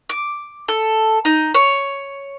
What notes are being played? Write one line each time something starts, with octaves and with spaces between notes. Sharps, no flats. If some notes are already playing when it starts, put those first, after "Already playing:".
D6
A4
D#4
C#5